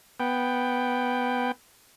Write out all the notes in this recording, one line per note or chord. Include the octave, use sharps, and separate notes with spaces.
B3 G5